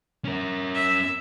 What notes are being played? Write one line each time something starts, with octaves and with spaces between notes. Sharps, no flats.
C#4 A#4
E5